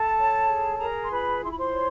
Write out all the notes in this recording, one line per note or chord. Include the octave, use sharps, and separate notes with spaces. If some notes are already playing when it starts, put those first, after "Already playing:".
Already playing: A4 A5
C#5
G#4
G#4 A#4 A#5
C6
F4 B4 B5
E4 C6
B5
C5 C6
C#5